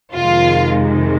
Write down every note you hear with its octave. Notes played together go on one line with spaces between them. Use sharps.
F2 C3 D#3 G#3 F4